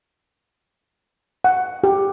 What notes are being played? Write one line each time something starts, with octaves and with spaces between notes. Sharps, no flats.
F#5
G4